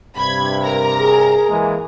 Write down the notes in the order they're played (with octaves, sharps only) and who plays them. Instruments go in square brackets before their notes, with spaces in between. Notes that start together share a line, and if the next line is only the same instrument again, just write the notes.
[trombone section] G2 C3 [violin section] B5 G#6
[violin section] A#4 A#5
[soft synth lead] G#4
[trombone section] E3 G#3 A#3